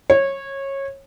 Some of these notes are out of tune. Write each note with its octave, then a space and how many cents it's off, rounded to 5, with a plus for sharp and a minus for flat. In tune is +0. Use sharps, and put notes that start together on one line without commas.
C#5 -20